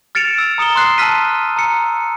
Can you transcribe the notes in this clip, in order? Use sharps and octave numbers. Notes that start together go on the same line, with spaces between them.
F6 A6 C#7 D7 E7 F7
E6
A#5 D#6 C#7 E7 G7
C6 D#6 F#6 C7
A5 C6 E6 F6 B6 D#7
A#5 E6 C#7